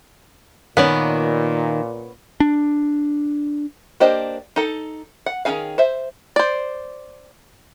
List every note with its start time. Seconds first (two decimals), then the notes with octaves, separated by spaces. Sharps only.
0.77 A#2 D#3 B3 C#4 D5
2.40 D4
4.00 A#3 D4 G4 C5 D#5
4.56 D#4 A4
5.26 F#5
5.45 D#3 F3 C#4 G#4 F5
5.78 C5 E5
6.36 C5 D5